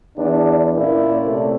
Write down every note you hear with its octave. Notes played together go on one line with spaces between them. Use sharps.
E2 D4
A#2 A#3 C#4 E4 D5
C3 A3